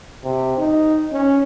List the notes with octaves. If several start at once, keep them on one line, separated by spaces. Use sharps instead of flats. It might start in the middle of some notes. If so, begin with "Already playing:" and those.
C3
D#4
C#4